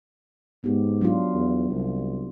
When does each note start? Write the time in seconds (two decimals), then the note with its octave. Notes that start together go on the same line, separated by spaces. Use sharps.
0.64 G#2 B3 G4
1.01 F#3 D4 F4
1.34 E2
1.70 C2